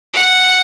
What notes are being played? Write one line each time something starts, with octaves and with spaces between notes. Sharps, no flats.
F#5